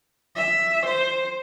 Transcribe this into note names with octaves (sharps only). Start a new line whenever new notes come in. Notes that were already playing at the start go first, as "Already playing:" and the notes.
E5
C5